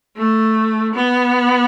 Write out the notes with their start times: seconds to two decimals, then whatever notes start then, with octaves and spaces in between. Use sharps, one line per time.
0.16 A3
0.94 B3